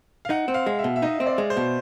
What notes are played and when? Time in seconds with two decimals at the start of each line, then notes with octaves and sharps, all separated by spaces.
0.25 F5
0.30 D#4 F#5
0.48 C4
0.54 F5
0.66 G#3
0.79 E5
0.84 B2
0.96 E5
1.02 D#4 D#5
1.20 C4
1.26 D5
1.38 G#3
1.50 C5
1.57 B2